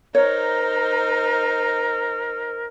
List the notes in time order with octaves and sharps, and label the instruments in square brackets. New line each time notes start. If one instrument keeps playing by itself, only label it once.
[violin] D#4 C5 [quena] A#4 [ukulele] C#5